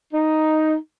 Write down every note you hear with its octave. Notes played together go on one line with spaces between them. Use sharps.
D#4